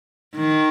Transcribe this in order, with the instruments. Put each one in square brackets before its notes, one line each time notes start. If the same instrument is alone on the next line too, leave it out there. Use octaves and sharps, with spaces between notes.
[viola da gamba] D#3